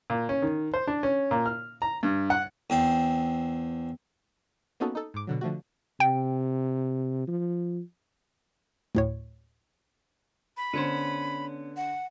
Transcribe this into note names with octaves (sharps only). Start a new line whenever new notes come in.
A#2
C#4
D#3
C5
D4
C#4
A#2
F6
A#5
G2
F#5
E2 C4
A#3 B3 C#4 D#4 F#4 A4
D#4 A4
G#2 D6
B2 D3 F#3
D3 F3 A3 F#4
C3 G5
F3
D2 A2 C#5
B5
D3 B3 C#4 C5
F#5